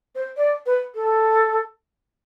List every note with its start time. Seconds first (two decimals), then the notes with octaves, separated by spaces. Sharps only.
0.15 C5
0.37 D5
0.66 B4
0.95 A4